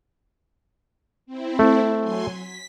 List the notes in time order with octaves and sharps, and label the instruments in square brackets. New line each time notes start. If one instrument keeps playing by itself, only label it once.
[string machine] C4 E4
[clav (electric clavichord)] A3
[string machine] F#3 G#5 C6
B6